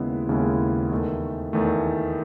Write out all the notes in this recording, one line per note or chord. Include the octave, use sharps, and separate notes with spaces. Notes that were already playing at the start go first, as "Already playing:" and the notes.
Already playing: D#2 C#3 G#3 B3 E4
D#2 C#3 G#3 B3 E4
E2 D#3 A3
E2 D#3 A3